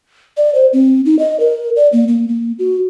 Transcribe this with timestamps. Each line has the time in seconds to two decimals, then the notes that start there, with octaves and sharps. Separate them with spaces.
0.37 D5
0.55 C5
0.73 C4
1.06 D#4
1.19 D#5
1.40 A#4
1.76 D5
1.93 A#3
2.08 A#3
2.28 A#3
2.59 F#4